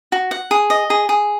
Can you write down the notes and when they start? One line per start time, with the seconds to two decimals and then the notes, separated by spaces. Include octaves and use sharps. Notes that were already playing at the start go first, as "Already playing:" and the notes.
0.12 F#4
0.31 F#5
0.51 G#4
0.70 D#5
0.90 G#4
1.09 G#4